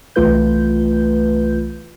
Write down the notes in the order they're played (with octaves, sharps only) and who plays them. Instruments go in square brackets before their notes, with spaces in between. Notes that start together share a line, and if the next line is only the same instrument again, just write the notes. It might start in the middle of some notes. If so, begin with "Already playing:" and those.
[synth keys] C2 E3 A3 F4 B4 G6